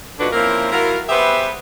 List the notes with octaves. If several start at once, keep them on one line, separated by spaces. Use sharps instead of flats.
A#2 D3 D4 D#4 F#4 B4
F3 A#3 C4 C#4 E4 A#4
F#3 E4 F4 A#4
B3 G4 G#4 B4 C5 E5